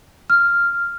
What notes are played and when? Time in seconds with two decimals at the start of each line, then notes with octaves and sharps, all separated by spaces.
0.30 F6